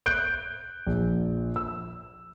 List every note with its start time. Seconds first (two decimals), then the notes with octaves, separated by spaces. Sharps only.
0.06 F#6 G6 D7
0.86 A#1
1.56 E6